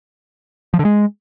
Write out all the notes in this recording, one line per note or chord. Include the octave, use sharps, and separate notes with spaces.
F3
D3
G#3